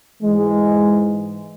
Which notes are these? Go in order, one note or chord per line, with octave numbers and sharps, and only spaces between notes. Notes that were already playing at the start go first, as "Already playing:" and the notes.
G#2 E3 G#3